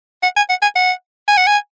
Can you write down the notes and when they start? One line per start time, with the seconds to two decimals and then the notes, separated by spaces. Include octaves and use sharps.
0.23 F#5
0.37 G#5
0.50 F#5
0.62 G#5
0.76 F#5
1.28 G#5
1.37 F#5
1.47 G#5